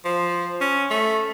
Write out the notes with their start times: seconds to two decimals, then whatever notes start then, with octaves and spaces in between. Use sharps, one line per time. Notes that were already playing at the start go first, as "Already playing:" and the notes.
0.05 F3
0.61 C#4
0.90 A3